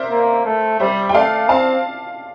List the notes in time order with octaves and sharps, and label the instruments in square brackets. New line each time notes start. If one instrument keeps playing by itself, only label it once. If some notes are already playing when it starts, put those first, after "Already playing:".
Already playing: [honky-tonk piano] A#4 C5 D5 E5
[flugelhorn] A#3
A3
[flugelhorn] G3 [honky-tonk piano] C5 E5
[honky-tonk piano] G5
[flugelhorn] A3 [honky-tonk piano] D5 F5
[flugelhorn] C4 [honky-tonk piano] F5 A5